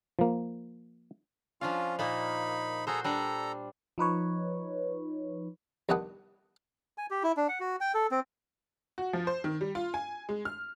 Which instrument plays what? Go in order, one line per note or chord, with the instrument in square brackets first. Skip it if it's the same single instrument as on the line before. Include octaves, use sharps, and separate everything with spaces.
[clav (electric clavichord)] F3 A#3
[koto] F3 D4 F5 [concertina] C#4 F4
[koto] A#2 A#3 [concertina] D#4 B5
[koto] F#4 C5 [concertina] G#4 A4 A#5
[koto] G3 D4 [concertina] A4 A#5
[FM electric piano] F3 D#4 B4 C#5
[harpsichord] C2 D#3 B3 D4 F#5 D#6
[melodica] G#5
G4
E4
D4
F#5
F#4
G5
A4
C4
[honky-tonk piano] F#4
F3
C5
D#3
G3
F4
G#5
G#3
F6